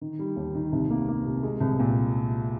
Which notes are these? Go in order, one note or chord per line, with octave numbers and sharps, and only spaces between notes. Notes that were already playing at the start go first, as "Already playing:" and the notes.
D#3
G3
D#2
D#3
C2
A#3
A#3
C3
G#3
C2
A#2